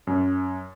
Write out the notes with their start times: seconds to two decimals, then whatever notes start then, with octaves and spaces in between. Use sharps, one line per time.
0.07 F#2